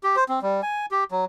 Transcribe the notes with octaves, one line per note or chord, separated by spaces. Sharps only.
G4
C5
C4
G3
G#5
G4
F#3